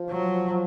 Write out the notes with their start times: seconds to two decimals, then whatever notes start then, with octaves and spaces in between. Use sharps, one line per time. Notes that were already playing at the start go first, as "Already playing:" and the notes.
Already playing: F3
0.10 F#3